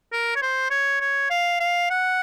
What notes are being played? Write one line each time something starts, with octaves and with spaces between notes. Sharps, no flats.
A#4
C#5
C5
C#5
C#5
F5
F5
F#5